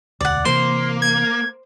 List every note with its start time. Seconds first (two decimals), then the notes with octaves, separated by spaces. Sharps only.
0.21 E1 D2 D5 F#5
0.45 C3 E3 A#3 C5 C6
1.02 G#6